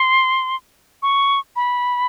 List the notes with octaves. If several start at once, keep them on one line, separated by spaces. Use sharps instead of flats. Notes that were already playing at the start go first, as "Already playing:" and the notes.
Already playing: C6
C#6
B5